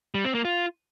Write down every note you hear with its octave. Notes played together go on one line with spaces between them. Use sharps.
G3
C4
A#3
F4